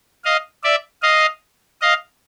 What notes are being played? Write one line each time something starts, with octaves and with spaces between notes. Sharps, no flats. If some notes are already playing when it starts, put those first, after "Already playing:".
D#5 F5
D5 E5
D#5 F5
D#5 F5